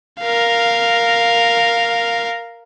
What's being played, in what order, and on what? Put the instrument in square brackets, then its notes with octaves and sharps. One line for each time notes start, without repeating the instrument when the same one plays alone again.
[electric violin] A#4 F5